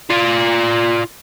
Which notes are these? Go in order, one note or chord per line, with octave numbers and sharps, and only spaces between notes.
F4 D5